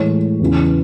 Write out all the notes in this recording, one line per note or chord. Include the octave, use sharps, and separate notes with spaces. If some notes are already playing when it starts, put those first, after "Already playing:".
Already playing: A2 E3 G#3 C#5
E2 C#3 E3